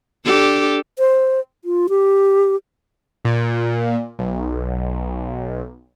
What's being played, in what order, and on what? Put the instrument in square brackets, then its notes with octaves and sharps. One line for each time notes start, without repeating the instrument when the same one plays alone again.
[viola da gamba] D4 G4 A4
[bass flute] C5
F4
G4
[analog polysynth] A#2
B1